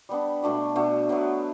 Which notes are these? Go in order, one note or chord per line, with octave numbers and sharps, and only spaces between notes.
G3 B3 D4
B2 A3 D4 F#4
B2 A3 D4 F#4
B2 F#3 B3